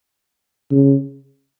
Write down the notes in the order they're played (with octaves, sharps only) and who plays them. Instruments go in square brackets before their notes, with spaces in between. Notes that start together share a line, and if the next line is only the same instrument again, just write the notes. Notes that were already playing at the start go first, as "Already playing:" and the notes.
[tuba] C#3